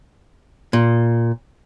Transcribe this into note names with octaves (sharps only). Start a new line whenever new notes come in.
A#2